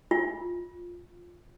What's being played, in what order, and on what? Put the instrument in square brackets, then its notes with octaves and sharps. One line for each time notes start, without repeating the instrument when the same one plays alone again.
[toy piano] F4